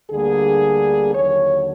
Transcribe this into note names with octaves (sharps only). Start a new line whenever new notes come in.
D2 D3 G3 A#3 G#4
D#2 D3 F#3 C#5